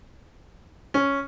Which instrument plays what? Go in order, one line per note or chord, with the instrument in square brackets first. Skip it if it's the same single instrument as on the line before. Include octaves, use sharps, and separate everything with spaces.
[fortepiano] C#4